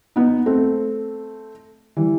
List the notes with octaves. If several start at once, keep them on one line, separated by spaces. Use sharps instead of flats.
B3 D#4
A3 C4
E3 G3